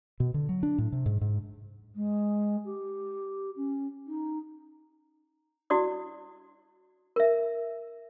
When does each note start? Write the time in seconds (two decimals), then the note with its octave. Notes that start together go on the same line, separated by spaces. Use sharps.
0.20 B2
0.34 D3
0.49 F#3
0.63 D4
0.78 A2
0.92 C3
1.06 G#2
1.21 G#2
1.95 G#3
2.65 G4
3.56 C#4
4.07 D#4
5.70 E4 F#4 D5 D#6
7.16 A#4 E5